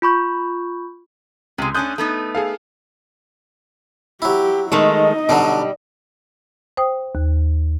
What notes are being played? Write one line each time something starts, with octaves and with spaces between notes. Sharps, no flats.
F4 B5 C#6 G6
C#2 C3 G#3
A3 C#4 D4 D#6 F#6 G6
A3 B3 D#4
G#4 A4 F5
F#3 E4 G4
D#3 G#3 A3 D#4 D#5
B2 D3 F#3 G3
C5 G5 D#6
D#2